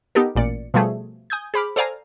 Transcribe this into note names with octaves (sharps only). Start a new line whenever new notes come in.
B3 D#4 G4 A4 A#4
A1 A#2 D5 C#7
B2 F3 G3 A3 G#4
G#5 D#6 G6 G#6
G#4 C5 B5 D6 F6
A4 C5 D5 F5 G#5 A#5